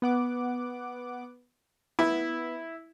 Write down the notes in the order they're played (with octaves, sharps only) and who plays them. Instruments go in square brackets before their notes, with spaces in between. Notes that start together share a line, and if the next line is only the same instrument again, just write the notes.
[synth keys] B3 F#5 D6
[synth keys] B3 [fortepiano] E4